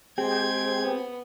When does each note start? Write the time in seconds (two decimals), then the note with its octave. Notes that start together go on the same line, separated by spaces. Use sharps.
0.18 G#3 C4 G4 G#4 G5 C6 G#6
0.83 B3